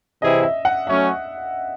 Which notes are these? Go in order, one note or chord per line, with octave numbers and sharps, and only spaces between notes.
C3 E3 C4 E4 G#4 D#5
E5
F#5
F#3 A3 C#4 E5